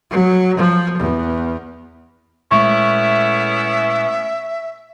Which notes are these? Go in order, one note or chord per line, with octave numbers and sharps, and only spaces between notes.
F#3
F3
E2
A#2 G#3 A3 B3 C#4 E4 E5 C#6